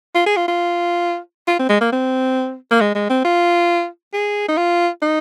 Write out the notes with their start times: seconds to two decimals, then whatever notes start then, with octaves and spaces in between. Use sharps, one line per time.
0.15 F4
0.26 G#4
0.37 F4
0.48 F4
1.48 F4
1.59 C4
1.69 G#3
1.81 A#3
1.93 C4
2.71 A#3
2.81 G#3
2.95 G#3
3.10 C4
3.25 F4
4.13 G#4
4.48 D#4
4.58 F4
5.03 D#4